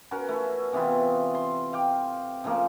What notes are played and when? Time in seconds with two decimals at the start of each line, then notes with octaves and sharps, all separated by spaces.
0.11 C#4 F#4 A#4 B4
0.29 A3 E4
0.73 C3 E3 B3 F4
1.35 C6
1.73 F5 G5 D6
2.44 C#3 F3 A3 A#3